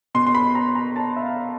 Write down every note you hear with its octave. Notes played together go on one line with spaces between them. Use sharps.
B2 C6
C6
B5
A#5
A#5
A5
E5
F5